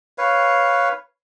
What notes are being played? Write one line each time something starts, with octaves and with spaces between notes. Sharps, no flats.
B4 C#5 F5